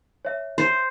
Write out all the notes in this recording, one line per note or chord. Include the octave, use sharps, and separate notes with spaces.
C#5 E5
C5